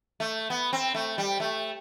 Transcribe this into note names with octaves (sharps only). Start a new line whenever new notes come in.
A3
B3
C4
A3
G3
A3